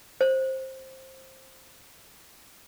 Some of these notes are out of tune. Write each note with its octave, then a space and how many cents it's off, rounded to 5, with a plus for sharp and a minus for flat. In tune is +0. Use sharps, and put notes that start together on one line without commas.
C5 +15